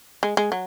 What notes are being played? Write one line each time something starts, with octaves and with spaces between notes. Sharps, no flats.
G#3
G#3
F#3